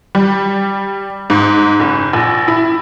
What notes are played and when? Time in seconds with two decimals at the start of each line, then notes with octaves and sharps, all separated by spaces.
0.15 G3
1.30 G#2
1.80 F#1
2.13 A#1
2.48 E4